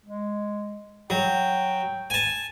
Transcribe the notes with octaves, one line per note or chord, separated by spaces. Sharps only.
G#3
F#3 G5
G#5 A5